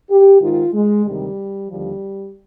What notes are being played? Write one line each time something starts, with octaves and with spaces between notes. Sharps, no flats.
G4
G#2 D#3 F4
G#3
D2 C3 D#3 G3
D#2 D3 F3 G3